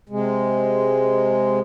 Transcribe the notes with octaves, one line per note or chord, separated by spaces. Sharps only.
C3 G#3